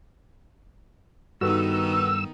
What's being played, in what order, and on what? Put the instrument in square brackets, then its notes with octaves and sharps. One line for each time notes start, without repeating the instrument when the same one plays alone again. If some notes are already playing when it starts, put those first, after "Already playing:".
[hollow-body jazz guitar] G2 [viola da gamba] D#3 B3 D#4 [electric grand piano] F#4 A4 B4 [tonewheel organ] E6